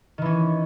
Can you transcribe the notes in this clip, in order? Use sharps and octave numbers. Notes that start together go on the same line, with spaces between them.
D#3 E3 C#4